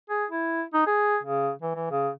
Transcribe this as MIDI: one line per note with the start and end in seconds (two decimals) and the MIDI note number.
0.10 0.25 68
0.30 0.63 64
0.74 0.82 63
0.87 1.18 68
1.23 1.51 49
1.62 1.74 52
1.76 1.86 52
1.91 2.09 49